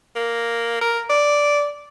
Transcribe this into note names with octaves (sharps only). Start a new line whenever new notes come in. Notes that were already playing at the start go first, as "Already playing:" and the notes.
A#3
A#4
D5